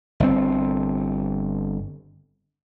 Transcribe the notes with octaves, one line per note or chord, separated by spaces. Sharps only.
G1 C4